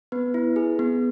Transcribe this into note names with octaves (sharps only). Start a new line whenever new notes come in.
B3 B4
E4
G#4
B3